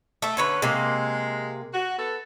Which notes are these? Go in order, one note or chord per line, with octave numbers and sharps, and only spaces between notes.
A3 E5
D3 C#4 B4
C3 G#3 A#3
F#4
B3 A4